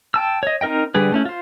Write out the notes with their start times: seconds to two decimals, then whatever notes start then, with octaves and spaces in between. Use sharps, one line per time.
0.14 G5 A5 E6
0.43 C#5 D#5
0.61 C4 D#4 A#4 D#5 G5
0.94 D3 G3 G#4 B4
1.12 A3 C#4 E4
1.25 F4 C5